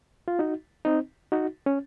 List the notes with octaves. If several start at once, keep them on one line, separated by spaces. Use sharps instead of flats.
F4
D#4 F#4
C4 D#4
D#4 F#4
C#4